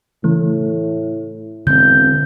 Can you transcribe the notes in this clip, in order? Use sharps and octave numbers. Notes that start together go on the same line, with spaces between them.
A2 C#3 E3 A3
E1 D3 C4 G6